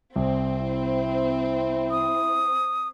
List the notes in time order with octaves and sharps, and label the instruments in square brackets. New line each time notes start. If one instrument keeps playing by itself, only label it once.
[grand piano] C2 [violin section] C4
[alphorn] E4
[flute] D#6